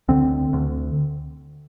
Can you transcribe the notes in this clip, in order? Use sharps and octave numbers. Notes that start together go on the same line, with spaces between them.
D2 D3 C4
D2 D3